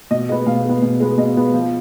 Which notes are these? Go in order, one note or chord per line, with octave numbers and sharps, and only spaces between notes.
B2 D#5
G#3 B3 D#5
B2 F5
G#3 B3
B2
G#3 B3
B2 D#5
G#3 B3
F3